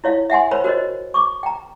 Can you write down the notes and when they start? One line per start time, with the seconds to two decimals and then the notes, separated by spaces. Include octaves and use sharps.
0.04 E4 C#5 F5
0.30 E5 F#5 G#5 C6
0.51 A#4 C5 C#5 B5
0.64 F#4 A#4 C5 C#5 D#5
1.14 C#6 D6
1.43 G5 A#5